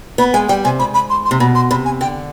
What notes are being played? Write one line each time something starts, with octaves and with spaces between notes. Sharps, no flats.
B3 B5
G#3 G#5
G3 G5
C3 G#5
G#2 B5
B5
C6
C6
C3
B2 B5
C6
C3 B5
G#5
D3 G5